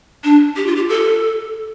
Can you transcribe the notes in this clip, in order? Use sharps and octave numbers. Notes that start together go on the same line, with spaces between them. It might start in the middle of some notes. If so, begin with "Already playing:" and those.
D4
G4
F4
G4
A4